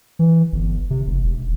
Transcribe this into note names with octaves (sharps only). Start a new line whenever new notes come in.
E3
G1
C3
F1
E1